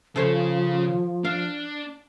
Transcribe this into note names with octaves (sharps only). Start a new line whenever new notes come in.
C#3 F3 A4 C5 C#5
D4 F5